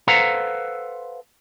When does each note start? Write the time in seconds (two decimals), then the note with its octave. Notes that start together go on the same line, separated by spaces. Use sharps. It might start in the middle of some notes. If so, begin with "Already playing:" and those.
0.07 A4 B4 C5 F5 F#5 A#5